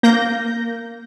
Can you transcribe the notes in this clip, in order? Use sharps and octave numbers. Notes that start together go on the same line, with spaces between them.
A#3 G6 A#6